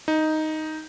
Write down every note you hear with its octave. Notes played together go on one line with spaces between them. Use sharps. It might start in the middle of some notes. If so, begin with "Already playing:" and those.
D#4